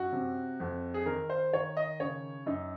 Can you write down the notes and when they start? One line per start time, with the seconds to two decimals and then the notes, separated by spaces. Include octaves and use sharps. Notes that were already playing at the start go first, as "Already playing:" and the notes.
Already playing: F#2 F#4
0.12 C3
0.60 F2
0.94 G#4
1.06 D#3 A#4
1.30 C5
1.53 D#3 C#5
1.77 D#5
2.00 C#3 C#5
2.46 F#2 D#4